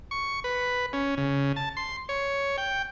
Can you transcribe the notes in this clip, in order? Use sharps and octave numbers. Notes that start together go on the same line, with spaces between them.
C#6
B4
C#4
C#3
A5
C6
C#5
G5